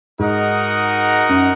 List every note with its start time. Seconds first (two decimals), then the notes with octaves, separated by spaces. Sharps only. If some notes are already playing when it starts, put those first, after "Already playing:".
0.19 G#2 D#4 F#4 A#4 D#5 F#5
1.29 F#2